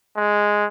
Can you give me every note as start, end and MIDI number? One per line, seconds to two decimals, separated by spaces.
0.17 0.66 56